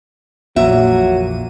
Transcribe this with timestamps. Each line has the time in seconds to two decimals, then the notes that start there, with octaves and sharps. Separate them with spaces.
0.56 A#1 F2 A#2 E3 F#3 A#3 E5 D#7